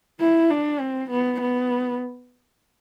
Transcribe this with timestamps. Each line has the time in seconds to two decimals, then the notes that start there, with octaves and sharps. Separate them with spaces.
0.20 E4
0.50 D4
0.80 C4
1.11 B3
1.41 B3